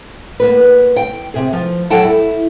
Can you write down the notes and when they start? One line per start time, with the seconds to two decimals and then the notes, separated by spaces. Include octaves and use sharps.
0.40 A#3 B3 B4
0.96 G5
1.34 C3 G#4
1.53 F3
1.90 F#3 A4 F#5 G5 A5
2.04 E4